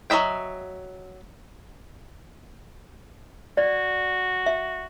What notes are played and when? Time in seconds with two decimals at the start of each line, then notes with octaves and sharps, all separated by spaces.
0.10 F#3 A#4 D#5 E5 G5
3.57 F#4 D5
4.46 E5